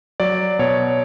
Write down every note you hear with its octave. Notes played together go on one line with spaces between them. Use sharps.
F#3 D5
B2 C#5